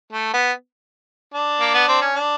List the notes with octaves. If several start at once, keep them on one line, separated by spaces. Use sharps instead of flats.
A3
B3
D4
A#3
B3
C4
C#4
D4